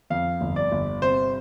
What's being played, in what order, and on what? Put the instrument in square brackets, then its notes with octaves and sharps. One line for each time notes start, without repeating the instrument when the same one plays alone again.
[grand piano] F2 F5
G1
D5
G1
C3 C5